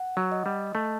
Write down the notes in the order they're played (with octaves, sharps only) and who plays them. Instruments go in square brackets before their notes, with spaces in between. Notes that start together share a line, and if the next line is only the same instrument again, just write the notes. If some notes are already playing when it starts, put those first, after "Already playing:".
Already playing: [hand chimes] F#5
[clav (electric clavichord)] F#3
[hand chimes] D#5
[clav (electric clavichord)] G3
[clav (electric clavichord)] A3 [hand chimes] A5